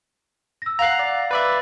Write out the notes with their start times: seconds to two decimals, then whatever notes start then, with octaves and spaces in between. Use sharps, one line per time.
0.62 E6 A#6
0.79 F5 F#5 A#5 F#6 C7
0.99 D5
1.31 B4 D5 E5 A6